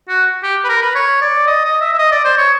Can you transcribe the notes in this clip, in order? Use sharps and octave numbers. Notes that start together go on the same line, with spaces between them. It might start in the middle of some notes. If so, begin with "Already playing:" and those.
F#4
G4
B4
A#4
B4
C#5
D5
D#5
D#5
E5
E5
D#5
D5
C5
C#5